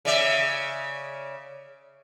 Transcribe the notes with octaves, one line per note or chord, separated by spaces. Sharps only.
C#3 D5 E5